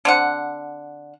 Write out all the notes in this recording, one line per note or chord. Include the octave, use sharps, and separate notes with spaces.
D3 C4 F#5